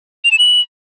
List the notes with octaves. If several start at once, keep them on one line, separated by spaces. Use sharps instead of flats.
F7
E7
F#7